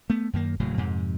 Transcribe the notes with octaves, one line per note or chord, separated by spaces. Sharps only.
A3 B3
F#2 D#3 A#3
D#1 A2 C#3 F#3
F2 G#2 C3